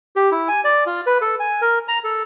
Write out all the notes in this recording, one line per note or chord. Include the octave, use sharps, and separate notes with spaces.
G4
E4
G#5
D5
F4
B4
A4
G#5
A#4
A#5
A4